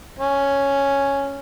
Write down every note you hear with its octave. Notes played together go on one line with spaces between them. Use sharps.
C#4